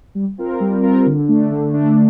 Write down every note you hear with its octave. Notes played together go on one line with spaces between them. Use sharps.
G3
C4 F4 A#4
G3
C4 F4 A#4
D3
A3 D4
D3
A3 D4